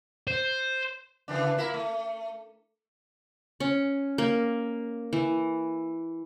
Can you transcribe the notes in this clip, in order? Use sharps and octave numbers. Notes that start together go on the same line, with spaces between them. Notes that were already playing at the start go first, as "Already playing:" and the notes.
C5
C#3 E3 D4
A#3 E4
A3
C#4
A#3
E3